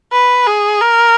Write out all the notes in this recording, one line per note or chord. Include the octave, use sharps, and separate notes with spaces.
B4
G#4
A#4